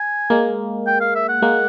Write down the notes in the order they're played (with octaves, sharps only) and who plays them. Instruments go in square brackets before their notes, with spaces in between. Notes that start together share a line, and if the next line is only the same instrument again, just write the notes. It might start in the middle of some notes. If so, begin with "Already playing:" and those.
Already playing: [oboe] G#5
[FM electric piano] G#3 A#3
[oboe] G5
F5
E5
F#5
[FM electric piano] G#3 A#3